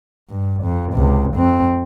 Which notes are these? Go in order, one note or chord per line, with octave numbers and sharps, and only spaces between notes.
G2
F2
C#2 C3
F2 C4